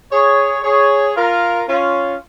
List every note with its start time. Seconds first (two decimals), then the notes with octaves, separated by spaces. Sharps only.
0.12 G#4 C#5
0.64 G#4 C#5
1.16 F4 A#4
1.69 C#4 F4